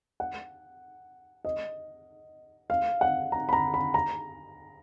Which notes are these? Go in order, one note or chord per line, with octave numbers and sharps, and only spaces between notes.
F#5
D#5
F5
F#5
A#5
B5
A#5
B5
A#5